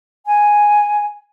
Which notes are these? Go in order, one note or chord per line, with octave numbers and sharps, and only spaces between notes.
G#5